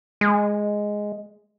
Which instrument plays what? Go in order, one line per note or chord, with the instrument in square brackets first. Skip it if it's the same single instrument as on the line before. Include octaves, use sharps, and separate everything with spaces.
[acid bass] G#3